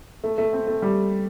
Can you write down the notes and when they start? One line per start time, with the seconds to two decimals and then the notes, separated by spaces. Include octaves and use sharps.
0.24 A3
0.38 A3
0.53 C4
0.67 A3
0.82 G3